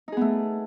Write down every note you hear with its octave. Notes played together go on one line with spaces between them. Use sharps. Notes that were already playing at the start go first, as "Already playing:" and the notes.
A3 B3 D#4 G#4